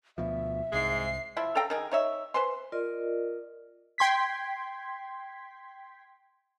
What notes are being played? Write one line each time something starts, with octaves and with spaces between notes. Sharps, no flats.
D2 B2 F3 E5
C2 G#2 G#3 C7
F3 E4 E5
A4 F5 G5 A#5
D#3 D#4 G#4
D#4 C#5 E5
B4 C5 G#5 C6
F4 A#4 D5 D#5
G5 C6 G#6 B6